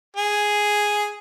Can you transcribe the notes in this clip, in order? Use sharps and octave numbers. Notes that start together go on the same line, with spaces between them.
G#4